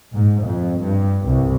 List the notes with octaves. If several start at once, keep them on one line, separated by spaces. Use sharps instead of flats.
G#2
F2
G2
C2